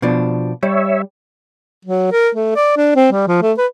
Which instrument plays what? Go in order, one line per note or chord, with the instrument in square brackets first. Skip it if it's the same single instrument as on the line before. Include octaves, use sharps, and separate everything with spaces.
[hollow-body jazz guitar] B2 F3 D4
[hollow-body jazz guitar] G3 [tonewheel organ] C#5 E5
[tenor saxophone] F#3
A#4
A3
D5
D4
C4
G3
F3
A3
B4